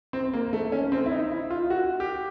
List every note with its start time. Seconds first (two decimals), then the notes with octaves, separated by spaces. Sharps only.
0.13 C4
0.33 A#3
0.53 A3
0.72 C#4
0.92 C4
1.06 E4
1.12 D#4
1.32 E4
1.50 F4
1.70 F#4
2.00 G4